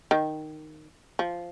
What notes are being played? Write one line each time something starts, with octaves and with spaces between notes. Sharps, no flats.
D#3
F3